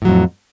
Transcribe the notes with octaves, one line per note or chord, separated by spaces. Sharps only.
F2 A2 F#3